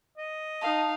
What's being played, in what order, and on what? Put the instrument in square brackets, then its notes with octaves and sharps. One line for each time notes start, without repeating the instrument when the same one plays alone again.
[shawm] D#5
[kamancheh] D#4 F5 [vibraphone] A5